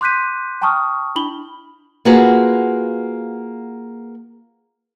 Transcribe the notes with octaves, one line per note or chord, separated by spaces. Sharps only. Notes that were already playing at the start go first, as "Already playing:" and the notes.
C6 D6 F#6 G6 B6 D#7
G5 A5 A#5 C#6 D#6 F6
D4 E4 B5 F#7 G7
A#3 F4 F#4 G#4 B4